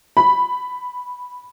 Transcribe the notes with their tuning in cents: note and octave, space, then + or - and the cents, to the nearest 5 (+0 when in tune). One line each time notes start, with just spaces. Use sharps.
B5 +0